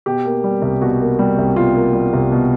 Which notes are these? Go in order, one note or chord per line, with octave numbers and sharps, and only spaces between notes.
B2 G4
A#3
G3
C2
B2 F#4
A#3
G3
C2
B2 F4
A#3
G3
C2
B2